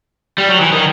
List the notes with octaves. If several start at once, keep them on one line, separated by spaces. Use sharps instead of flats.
G3
F#3
E3
D#3